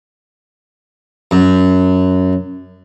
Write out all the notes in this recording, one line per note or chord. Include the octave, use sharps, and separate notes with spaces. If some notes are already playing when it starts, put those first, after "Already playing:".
F#2